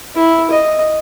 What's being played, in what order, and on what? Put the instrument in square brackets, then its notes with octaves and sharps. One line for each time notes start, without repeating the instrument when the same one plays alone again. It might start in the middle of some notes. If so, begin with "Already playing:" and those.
[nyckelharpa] E4
D#5